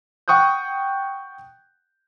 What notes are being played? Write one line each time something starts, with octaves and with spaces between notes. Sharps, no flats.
F#5 G5 C#6 D#6 F#6 G6